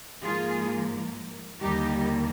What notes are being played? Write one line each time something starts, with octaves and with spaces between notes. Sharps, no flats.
G#2 F3 A#3 F4 G#4
D#2 D3 G3 A#3 D#4 G4